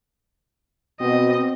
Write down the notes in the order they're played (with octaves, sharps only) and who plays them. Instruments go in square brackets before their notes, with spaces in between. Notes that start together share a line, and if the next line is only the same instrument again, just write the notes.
[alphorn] B2 [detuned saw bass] C4 [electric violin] D#5